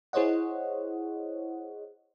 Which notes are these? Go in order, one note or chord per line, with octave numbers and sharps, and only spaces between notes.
E4 G#4 C5 C#5 D#5 F#5